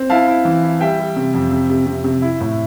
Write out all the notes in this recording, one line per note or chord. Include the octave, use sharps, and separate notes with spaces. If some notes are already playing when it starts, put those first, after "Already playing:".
Already playing: C4
E4 F5 A5
E4
E3
E4
G3 E5 G5
G3
C3
F2
C3
C3
C3
C3
E4
A2